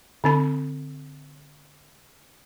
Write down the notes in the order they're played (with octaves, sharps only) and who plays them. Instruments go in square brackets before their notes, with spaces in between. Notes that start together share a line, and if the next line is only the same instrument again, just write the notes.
[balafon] D3 C4 B5